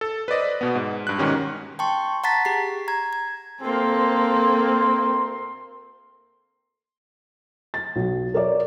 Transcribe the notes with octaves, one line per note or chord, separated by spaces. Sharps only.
A4
B4 C5 D5 D#5
B2 B3
G#2
G2 F#6
G#2 B2 D#3 C#4 G4
G5 A5 C6 C#6
F#5 A5 A#5 A6 B6
G4 G#4 C7
A#5 G#6
G#6
D2 A#3 C4 A4 A#4 C6
A6
B1
A#4 C#5 D5